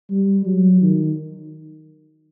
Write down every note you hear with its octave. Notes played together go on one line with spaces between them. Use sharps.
G3
F#3
D#3